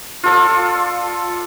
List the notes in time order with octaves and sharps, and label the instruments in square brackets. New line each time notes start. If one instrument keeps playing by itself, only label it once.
[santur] F4 A4 D5